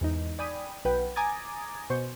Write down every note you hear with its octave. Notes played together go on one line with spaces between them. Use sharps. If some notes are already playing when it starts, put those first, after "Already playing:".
E2 G#2 D#4
D5 G5 G#5 B5 D#6
B1 B4 F#5 G5
G#5 A#5 D6 D#6 G#6 A6
B2 C5 C#6 G6